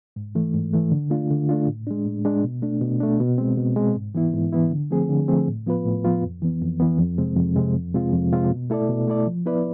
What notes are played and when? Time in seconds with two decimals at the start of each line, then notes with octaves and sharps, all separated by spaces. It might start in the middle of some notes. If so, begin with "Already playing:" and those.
0.16 G#2
0.35 E3 A3
0.54 G#2
0.73 E3 A3
0.92 D3
1.10 A3 D4 F4
1.30 D3
1.49 A3 D4 F4
1.67 A2
1.87 G#3 D4
2.06 A2
2.25 G#3 D4
2.44 B2
2.62 A3 D4
2.81 B2
3.00 A3 D4
3.20 B2
3.38 G#3 C4
3.57 B2
3.76 G#3 C4
3.95 G#2
4.15 E3 B3 E4
4.33 G#2
4.52 E3 B3 E4
4.71 D3
4.91 F3 A3 C4 G#4
5.09 D3
5.28 F3 A3 C4 G#4
5.47 A2
5.66 F3 B3 F4 B4
5.85 A2
6.04 F3 B3 F4 B4
6.23 F2
6.42 E3 B3
6.61 F2
6.80 E3 B3
6.99 F2
7.18 C3 G#3 C4
7.37 F2
7.56 C3 G#3 C4
7.75 F2
7.94 C3 G#3 C4 F4
8.13 F2
8.32 C3 G#3 C4 F4
8.51 B2
8.70 A3 E4 A4 D5
8.89 B2
9.08 A3 E4 A4 D5
9.27 F3
9.46 B3 E4 B4 D5